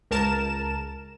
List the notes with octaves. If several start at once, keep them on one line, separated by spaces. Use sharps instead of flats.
C#2 A#4 A5 E7